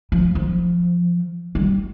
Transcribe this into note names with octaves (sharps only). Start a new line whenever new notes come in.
F3
F3
G3